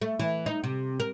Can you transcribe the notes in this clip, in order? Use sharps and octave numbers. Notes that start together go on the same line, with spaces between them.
A3
E3
D#4
C3
A#4